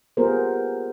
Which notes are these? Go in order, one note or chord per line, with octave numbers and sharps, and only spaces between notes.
B3 F4 G4 G#4 A#4 C5